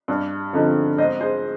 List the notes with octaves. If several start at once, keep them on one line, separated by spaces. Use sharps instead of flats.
G2
D3 F3 C4 D#4
G#2 C5 D#5
G#4 C5